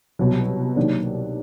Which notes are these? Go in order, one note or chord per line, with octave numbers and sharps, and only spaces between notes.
C2 B2 F#3
C3 D#3 F#3 A#3 D4